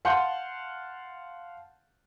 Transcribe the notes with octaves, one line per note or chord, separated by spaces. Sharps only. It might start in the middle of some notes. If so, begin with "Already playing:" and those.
F5 F#5 A5 C6 F#6 G6